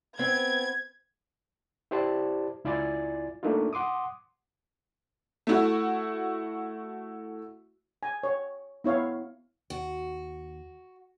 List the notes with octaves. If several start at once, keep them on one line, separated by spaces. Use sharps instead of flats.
B3 C4 G#6
E4 G4 C5 D5 A5
C#2 E4 F4 D5 G#5 A6
A3 A#3 D4 D#4 F4
F#5 C6 D6 D#6
A3 E4 F#4
G#5
C#5
B3 E4 C#5 F5
D#2 F#4